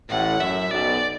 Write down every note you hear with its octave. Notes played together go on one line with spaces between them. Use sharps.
A1 A2 F#5
F#2 E5
B1 B2 D5